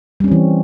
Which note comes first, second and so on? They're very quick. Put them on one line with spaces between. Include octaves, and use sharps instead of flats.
G3 C#4 C4 E3